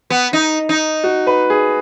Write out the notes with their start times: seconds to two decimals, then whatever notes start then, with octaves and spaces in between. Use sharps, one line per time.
0.10 B3
0.33 D#4
0.69 D#4
1.04 F#4
1.27 B4
1.50 G#4